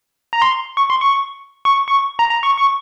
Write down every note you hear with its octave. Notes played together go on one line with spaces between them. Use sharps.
A#5
C6
C#6
C6
C#6
C#6
C#6
A#5
A#5
C#6
C#6